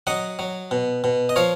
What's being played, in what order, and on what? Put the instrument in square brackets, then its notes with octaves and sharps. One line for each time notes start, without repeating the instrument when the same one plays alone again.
[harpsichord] F#3 D#5 F#5
F#3
B2
B2
D#5
F3 C#5 F5